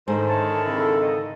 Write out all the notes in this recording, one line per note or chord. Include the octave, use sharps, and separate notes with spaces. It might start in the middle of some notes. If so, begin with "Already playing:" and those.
G#2 D3 D#3 C5
C#5 E5 A5
C#3 C4 E4 A4
D#5